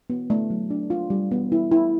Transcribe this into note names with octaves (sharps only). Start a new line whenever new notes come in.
B3
A3
F#3
D4
F4
G3
B3
E4
E4